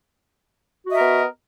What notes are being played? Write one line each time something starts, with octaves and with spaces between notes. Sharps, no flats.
B3 F#4 A#4 D#5 E5